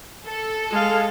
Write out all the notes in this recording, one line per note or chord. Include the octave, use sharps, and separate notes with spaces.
A4
G#3 F5